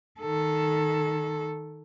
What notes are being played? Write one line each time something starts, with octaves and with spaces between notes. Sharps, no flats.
D#3 A4